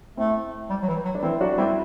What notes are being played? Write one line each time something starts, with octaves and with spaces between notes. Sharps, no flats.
A3 C4 E4
G3
F#3
E3
F#3
D4
E3 C4 E4
F#3 D4 F#4
G3 C4 E4